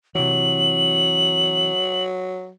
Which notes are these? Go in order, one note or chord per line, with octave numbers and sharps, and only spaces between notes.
C3 E3 F#3 F#7